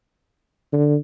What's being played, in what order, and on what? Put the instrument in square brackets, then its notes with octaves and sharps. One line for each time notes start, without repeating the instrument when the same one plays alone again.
[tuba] D3